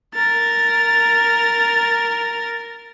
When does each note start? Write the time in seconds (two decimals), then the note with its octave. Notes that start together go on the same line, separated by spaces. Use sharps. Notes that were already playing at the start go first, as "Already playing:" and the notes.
0.15 A#4 A6